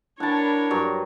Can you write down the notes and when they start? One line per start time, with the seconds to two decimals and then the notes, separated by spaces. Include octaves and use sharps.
0.20 D4 E4 A#4 C#5 F#5 A5
0.71 G2 F#3